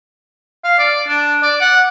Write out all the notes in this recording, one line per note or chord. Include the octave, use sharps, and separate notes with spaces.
F5
D5
D4
D5
F#5